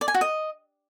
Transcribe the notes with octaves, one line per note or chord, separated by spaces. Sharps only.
D5
G#5
F#4
D#5